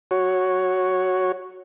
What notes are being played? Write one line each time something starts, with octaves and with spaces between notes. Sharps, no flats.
F#4 C#5